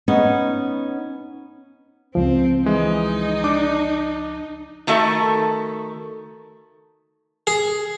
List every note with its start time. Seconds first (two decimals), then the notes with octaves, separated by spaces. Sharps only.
0.08 B3 C#4 D#4
2.15 C#2 F3 C4
2.66 E3 G#3 D#4
3.44 D4 D6
4.87 D#3 A3 F#4 A4 E5
7.47 G#4